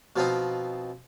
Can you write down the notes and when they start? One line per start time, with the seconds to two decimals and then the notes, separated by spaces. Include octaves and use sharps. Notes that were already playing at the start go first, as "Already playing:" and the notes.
0.16 B2 F3 C4 D#4